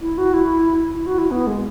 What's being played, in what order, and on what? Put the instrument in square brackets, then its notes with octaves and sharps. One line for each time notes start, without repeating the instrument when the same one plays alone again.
[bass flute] E4
F#4
E4
E4
F#4
E4
B3
G#3